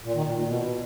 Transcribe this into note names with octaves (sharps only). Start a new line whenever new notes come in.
A#2
D#3
A#2
A#2
B2